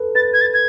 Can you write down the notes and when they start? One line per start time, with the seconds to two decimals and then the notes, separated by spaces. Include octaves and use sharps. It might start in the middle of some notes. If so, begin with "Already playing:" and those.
Already playing: A4 B4
0.15 B4 A6
0.34 G#6
0.41 A6
0.54 G#6